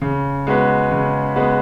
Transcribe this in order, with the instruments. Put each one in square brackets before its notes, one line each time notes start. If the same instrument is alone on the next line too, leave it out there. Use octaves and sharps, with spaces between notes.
[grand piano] C#3
G#3 B3 F#4 B4
C#3
G#3 B3 F#4 B4